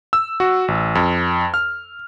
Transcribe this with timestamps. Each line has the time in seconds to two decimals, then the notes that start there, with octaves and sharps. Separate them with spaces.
0.13 E6
0.40 F#4
0.68 A1
0.95 F2
1.54 F6